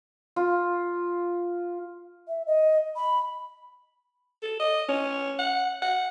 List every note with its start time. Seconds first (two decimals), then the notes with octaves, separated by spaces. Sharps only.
0.36 F4
2.28 E5
2.47 D#5
2.96 B5
4.42 A4
4.60 D#5
4.89 C#4
5.39 F#5
5.82 F#5